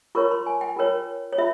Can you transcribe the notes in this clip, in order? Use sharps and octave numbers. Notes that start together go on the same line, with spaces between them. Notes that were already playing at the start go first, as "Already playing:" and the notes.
F4 A#4 C#5 C#6
C6
G#5
G5
F4 A#4 C#5
C#5
F4 E5